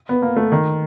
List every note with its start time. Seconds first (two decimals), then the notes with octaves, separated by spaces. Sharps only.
0.09 B3
0.22 A#3
0.37 A3
0.52 D#3